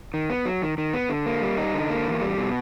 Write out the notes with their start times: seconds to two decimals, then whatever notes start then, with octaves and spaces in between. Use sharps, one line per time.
0.14 D#3
0.30 B3
0.46 F#3
0.62 D#3
0.78 D#3
0.94 B3
1.09 D3
1.26 A#3
1.42 G3
1.58 D#4
1.74 D3
1.90 A#3
2.06 E2
2.22 G3
2.38 B2